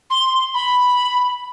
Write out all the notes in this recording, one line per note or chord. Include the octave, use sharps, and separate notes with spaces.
C6
B5